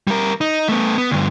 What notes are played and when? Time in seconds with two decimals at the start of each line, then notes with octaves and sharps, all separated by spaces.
0.07 G3 A#4
0.41 D#4
0.69 A3 B3
0.98 B3
1.12 D2 G2